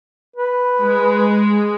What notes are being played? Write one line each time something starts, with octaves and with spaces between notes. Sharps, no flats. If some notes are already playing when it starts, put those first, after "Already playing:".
B4
G#3